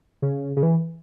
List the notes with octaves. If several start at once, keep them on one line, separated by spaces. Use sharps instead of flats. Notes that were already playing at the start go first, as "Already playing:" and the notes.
C#3
C#3
E3